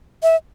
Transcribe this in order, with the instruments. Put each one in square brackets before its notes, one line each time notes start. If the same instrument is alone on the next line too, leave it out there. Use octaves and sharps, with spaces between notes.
[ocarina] E5